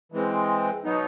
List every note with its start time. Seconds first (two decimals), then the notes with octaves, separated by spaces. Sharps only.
0.12 E3 G#3 C4
0.84 B2 F#3 B3 D#4